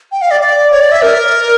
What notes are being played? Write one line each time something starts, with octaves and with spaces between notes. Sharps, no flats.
G5
F5
D5
D5
C#5
D5
E5
A#4